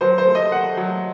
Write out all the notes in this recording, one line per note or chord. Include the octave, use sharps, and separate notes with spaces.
F#3 C5
C5
A3
D#5
A3 F#5
F#3